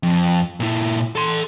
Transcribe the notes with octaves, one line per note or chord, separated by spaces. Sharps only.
F2
A#2 E4
A4 C6